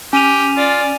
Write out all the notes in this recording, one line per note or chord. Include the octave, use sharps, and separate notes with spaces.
C#4 G4 G#5 D#7 F7
F4 D5